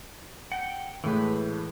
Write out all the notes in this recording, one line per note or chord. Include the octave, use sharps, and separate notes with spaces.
F#5 G5
A2 E3 G#3 A3 B4